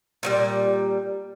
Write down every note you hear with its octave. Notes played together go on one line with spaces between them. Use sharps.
A#2 F#3 G3